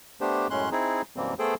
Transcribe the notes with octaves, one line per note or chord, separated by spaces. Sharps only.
A3 B3 D4 G4 C5
F#2 A2 G#3 C#4 C6 F#6
C4 D#4 E4 G#4
F#2 B2 E3 G3 A#3 C4
A3 B3 G#4 A4 C5 G5